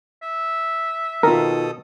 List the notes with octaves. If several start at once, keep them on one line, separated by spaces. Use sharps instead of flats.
E5
B2 D#3 F4 A4 A#4 D#6